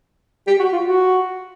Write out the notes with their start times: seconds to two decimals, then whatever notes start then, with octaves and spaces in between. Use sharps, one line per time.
0.47 G4
0.59 F#4
0.72 F4
0.84 F#4